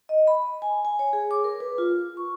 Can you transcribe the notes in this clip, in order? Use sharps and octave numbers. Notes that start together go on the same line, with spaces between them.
D#5
B5
G#5
G#5
C#5
G#4
D6
A#4
B4
F4
C#6